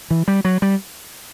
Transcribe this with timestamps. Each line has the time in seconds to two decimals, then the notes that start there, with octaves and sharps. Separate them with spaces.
0.11 E3
0.28 G3
0.45 F#3
0.62 G3